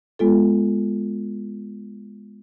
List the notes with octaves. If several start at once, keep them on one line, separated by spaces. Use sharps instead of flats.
G#3 B3 F4 A4